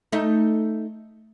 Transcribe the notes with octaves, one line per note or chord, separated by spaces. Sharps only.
A3 D#4